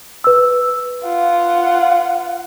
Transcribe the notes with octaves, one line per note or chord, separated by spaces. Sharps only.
B4 E6
F4 F#5